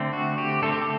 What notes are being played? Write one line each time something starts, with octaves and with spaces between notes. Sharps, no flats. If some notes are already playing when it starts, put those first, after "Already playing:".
Already playing: D3 A3 C4
F#4
G4
D3 A3 C4 A4
G4
A4